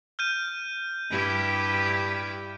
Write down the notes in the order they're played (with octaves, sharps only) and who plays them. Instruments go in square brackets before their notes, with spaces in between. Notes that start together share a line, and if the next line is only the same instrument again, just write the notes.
[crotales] F6 G6 D#7
[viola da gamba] G2 E4 G4